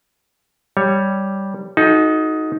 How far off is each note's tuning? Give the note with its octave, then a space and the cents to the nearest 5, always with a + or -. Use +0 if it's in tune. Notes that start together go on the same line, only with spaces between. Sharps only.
G3 -5 C#5 +5
D#4 +10 F#4 -15 A4 -40